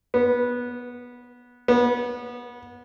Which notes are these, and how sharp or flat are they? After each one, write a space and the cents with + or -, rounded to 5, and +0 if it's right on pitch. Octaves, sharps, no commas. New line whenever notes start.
B3 -15
B3 -25